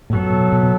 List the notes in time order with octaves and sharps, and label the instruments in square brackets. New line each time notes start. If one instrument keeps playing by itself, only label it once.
[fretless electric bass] A2
[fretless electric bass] F#2 [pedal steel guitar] F#3 B3 A4
[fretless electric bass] B2
B2
B2